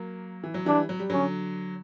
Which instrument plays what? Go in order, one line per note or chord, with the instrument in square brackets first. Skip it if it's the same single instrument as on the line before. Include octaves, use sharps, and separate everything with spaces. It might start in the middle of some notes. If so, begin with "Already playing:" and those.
Already playing: [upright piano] F#3 A#3
E3
F#3
[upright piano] E3 G3 [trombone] D4
[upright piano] F#3
G3
[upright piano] D3 F#3 [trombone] C#4